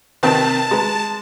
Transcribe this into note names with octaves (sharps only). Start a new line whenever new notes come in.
C3 D#3 C4 B4 G5 A5
G#3 B4 A#5